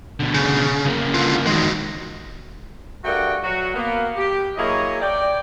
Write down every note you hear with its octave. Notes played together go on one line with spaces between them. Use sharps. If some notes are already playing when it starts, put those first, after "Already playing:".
B2 D3
C#3
C#3 A#3
D3 F4
E2 D#3 G#3 F#4
G2 A3 F#4 A#4 F#5 G5
F#3 F#4
A#3 B3
G4
F#3 A#3 E4 G#4 C#5 D#5
D5 G5